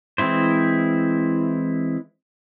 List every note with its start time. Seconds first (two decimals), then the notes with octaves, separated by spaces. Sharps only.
0.18 E3 G#3 C4 E4 C5